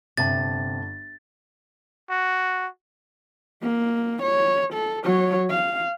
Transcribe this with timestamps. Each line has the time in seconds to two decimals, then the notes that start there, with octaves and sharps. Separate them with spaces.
0.17 G1 C3 A5 A6
2.10 F#4
3.62 A#3
4.22 C#5
4.73 A4
5.04 F#3 C#5
5.50 F5